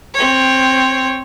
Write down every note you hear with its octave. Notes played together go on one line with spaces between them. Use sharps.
C4 C#5